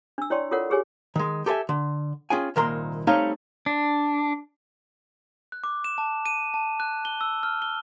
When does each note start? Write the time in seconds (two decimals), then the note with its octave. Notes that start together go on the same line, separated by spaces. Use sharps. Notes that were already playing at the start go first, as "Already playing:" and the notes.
0.18 D4 E6
0.30 E4 C#5 D5 G5 C6 C#6
0.51 F4 A4 A#4 C#5 F#5
0.70 G4 G#4 C#5 G#5
1.16 D#3 G#3
1.46 G4 A4 B4 E5 G#5
1.69 D3
2.30 C#4 F4 G#4 G5 G#5
2.56 C2 A#2 D#3 A#4 A#5 C6
3.07 G3 A3 C4 D#4 C#5 F5
3.66 D4
5.52 F#6
5.64 D6
5.84 E7
5.98 A5
6.26 D#7
6.54 A5
6.80 F#6
7.05 G7
7.21 E6
7.43 F6
7.62 G7